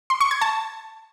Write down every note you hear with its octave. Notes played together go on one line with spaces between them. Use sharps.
C6
C#6
G#6
A5